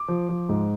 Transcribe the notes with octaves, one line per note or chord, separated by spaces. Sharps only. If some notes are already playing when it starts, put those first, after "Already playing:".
Already playing: D6
F3
F3
G#2